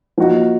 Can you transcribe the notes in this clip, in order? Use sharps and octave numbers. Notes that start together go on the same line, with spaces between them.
F3 A#3 D#4 F#4